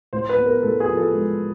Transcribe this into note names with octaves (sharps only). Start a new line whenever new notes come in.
A2 C5
B4
B3
A#4
A2 A4
G#4
F3
A4
G#3